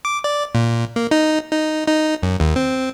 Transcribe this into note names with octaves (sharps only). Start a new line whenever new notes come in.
D6
D5
A#2
A#3
D#4
D#4
D#4
F#2
D#2
C4